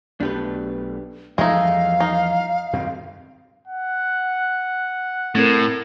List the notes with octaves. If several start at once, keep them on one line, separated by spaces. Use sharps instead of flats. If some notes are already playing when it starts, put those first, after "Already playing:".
B1 A3 B3 D4 G4 B4
E2 G2 F3 G#3 A3 D#4 F5
D#4
F#2 D#3 C4
F#5
A2 A3 C4 A#4